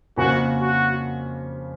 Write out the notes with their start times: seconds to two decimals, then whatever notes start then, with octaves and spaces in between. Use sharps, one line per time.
0.17 F2 C#3 F3 A#3 C#4 F#4
0.62 F#4